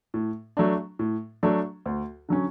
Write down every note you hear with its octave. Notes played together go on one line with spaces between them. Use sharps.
A2
F#3 A3 D4
A2
F#3 A3 D4
D2
D3 F#3 C#4